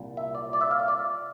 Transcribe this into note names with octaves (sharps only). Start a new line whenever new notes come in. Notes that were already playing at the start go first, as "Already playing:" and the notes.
Already playing: C2 A#2
E5
D5
D5
E5
F5
E5
D5